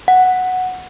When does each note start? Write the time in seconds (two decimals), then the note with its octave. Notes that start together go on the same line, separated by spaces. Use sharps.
0.08 F#5